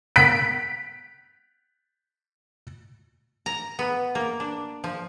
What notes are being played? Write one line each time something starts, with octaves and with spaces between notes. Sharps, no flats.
B6 D7
A#5
B3
A#3
D4
F3